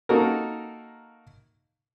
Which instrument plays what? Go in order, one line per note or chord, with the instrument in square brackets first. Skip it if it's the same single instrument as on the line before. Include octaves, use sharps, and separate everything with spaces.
[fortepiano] A#3 D#4 F#4 A4 A#4